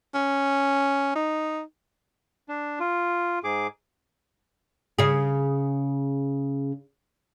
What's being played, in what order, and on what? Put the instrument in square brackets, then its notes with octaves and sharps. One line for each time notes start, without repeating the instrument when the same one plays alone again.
[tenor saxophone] C#4
D#4
[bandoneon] D4
F4
G#2 G#4 D6
[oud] C#3 G#4